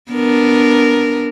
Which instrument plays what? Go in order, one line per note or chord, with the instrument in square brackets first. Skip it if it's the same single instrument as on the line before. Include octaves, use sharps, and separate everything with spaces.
[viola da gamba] B3 D4 A#4